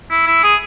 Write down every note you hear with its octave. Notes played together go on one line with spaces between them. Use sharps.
E4
E4
G#4